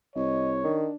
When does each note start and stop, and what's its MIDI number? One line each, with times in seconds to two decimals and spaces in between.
0.16 0.65 36
0.16 0.80 73
0.16 0.51 75
0.64 0.88 51
0.64 0.95 62